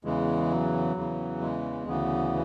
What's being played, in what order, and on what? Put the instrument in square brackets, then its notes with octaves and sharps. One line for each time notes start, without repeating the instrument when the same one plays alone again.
[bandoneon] E2 C#3 E3 G#3
F#3
E2 C#3 E3
G#3
D2 C#3 E3 B3